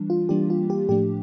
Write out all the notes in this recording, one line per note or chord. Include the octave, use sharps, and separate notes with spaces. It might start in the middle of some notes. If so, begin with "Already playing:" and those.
Already playing: E3 G3 D4
F4
E3 G3 A#3 D4 G4
F4
G4
A2 F3 A3 D4 G4